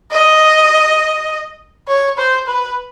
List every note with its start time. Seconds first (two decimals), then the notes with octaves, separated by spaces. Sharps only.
0.11 D#5
1.88 C#5
2.18 C5
2.47 B4